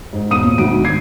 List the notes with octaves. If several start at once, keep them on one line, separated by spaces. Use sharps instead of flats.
G#2
E1 D#6 D#7
A#2
G#1 D2 D#3 D7
G#6 C7